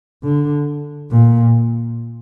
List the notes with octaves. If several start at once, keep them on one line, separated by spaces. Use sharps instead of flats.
D3
A#2